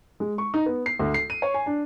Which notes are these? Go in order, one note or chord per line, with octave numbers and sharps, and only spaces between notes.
G#3
C#6
D#4
B3
C7
D2
C7
D#7
C#5
G#5
D4